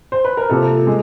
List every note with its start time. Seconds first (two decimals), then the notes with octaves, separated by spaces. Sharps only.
0.12 C5
0.25 B4
0.37 A#4
0.50 C3 F3 A#3 A4
0.87 G#3